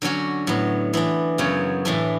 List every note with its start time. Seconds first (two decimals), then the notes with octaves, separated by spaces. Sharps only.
0.02 D3 F#3 C#4 F#4
0.47 A2 F#3 B3
0.94 E3 B3 D4
1.38 F#2 C#3 F#3 B3
1.85 A2 E3 A3 D4